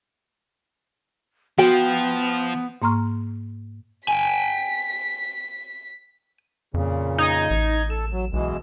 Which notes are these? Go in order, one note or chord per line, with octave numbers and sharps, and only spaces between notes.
F3 B3 F#4 G5
G#2 A#3 A#5 C6 C#6 F6
G5 G#5 B6
F2 A#2 C#3
D#4 G#6
A1
A4 E7
F#3
B1 B2 E3 G#3